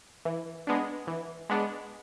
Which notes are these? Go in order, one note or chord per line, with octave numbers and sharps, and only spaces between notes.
E3
G#3 B3 D4
E3
G#3 B3 D4